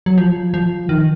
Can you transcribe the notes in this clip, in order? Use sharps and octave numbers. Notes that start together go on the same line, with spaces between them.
F#3
F3
F3
D#3